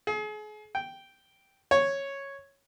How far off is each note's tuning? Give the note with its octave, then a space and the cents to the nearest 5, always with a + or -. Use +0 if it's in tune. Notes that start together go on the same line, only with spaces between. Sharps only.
G#4 +35
G5 -5
C#5 -5